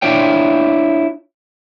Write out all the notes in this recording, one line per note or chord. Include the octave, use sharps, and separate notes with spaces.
D4 E4 F4 C#5 G5